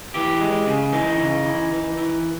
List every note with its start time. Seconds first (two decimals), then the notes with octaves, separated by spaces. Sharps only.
0.14 E3 G4
0.40 G#3
0.67 C#3
0.92 E3 D#4
1.19 C#3
1.45 E3
1.72 E3
1.97 E3